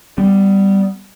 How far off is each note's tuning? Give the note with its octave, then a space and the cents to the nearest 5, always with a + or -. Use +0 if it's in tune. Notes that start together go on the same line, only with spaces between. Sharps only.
G3 +0 B3 +25